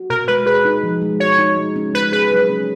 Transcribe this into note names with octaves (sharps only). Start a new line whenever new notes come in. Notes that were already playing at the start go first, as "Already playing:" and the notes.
Already playing: F#4
B2 A#4
G#3 B4
G#4 B4
D#4
F3
G#3
F#4 C#5
D#4
G#3
C#4
G#3 B4
G#4 B4
F#3
C#4